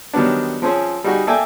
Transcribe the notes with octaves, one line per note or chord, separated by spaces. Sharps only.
D#3 F#3 G3 B3 D4
F3 C4 C#4 G#4
G3 D#4 F#4 G#4
A#3 A4 D5 E5 G5 G#5